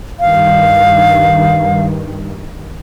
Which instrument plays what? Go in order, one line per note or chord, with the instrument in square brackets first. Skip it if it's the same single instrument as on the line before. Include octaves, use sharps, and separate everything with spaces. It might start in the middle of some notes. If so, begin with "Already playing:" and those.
[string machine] G2 D#3 [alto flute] F5